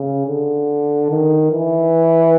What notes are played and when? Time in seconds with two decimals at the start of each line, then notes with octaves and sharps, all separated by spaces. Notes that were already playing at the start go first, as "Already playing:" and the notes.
Already playing: C#3
0.27 D3
1.10 D#3
1.52 E3